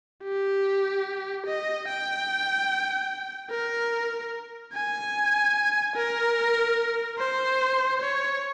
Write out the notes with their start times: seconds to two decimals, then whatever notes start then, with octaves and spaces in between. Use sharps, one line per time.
0.24 G4
1.47 D#5
1.88 G5
3.51 A#4
4.74 G#5
5.96 A#4
7.19 C5
8.01 C#5